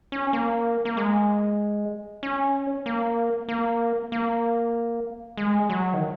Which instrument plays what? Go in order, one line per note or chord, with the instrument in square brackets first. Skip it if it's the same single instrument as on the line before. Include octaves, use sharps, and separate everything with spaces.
[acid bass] C#4
A#3
A#3
G#3
C#4
A#3
A#3
A#3
G#3
F#3
D#3